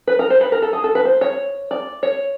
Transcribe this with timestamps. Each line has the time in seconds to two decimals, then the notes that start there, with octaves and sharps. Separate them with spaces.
0.07 B4
0.19 A#4
0.30 C5
0.41 B4
0.52 A#4
0.62 A4
0.73 G#4
0.84 A4
0.95 B4
1.05 C5
1.21 C#5
1.71 D5
2.03 C#5